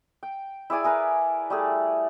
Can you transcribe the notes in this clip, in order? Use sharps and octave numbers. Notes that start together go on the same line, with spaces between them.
G5
E4 G#4 D5 G#5
G#4 A#4 B4
G3 A3 G#4